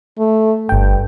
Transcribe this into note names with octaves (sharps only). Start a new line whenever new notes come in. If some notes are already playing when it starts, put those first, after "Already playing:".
A3
G1 G2 G5